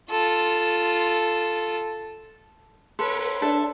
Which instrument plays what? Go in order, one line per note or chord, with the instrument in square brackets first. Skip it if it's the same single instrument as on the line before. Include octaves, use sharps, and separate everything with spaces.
[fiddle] F4 A4
[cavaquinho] A4 [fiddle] B4 C#5 [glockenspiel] C6
[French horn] D4 [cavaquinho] A4 E5 A5